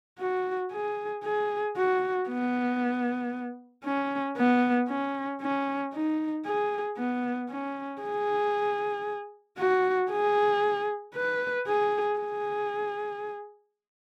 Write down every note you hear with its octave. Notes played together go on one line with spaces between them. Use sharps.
F#4
G#4
G#4
F#4
B3
C#4
B3
C#4
C#4
D#4
G#4
B3
C#4
G#4
F#4
G#4
B4
G#4
G#4